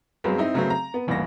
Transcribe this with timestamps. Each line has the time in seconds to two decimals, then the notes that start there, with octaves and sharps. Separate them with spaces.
0.24 G2 F#3 G#3 B3 C4
0.38 C4 D#4 E4
0.54 C#3 F#3 A3 B3 C4
0.70 A#5
0.94 B3
1.07 E1 A1 G2 A#2 A#6